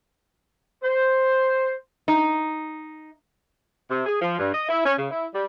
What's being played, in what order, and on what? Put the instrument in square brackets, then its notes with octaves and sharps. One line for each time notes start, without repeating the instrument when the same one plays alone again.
[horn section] C5
[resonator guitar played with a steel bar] D#4
[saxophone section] C3
G#4
F3
G2
D#5
E4
C#4
C#3
E4
G3